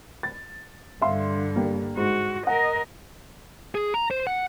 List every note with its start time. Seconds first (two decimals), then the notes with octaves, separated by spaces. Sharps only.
0.23 A6
1.02 G2 D3 E5 F5 C6
1.56 G3 A#3
1.97 G#2 F#4
2.47 A#4 D#5 F#5
3.75 G#4
3.94 A#5
4.11 C5
4.27 F#5